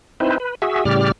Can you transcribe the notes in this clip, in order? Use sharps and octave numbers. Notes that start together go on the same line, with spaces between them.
C4 D#4 E4 B4 C5
B4
F#4 G#4 E5
A2 C#3 G3 G4 D5 F6